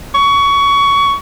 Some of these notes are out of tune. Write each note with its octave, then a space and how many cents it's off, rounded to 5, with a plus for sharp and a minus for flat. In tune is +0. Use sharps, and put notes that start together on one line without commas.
C#6 +20